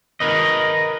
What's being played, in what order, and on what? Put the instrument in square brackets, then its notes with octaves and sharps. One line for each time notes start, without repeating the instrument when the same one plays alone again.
[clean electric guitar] A#4 B4 D#5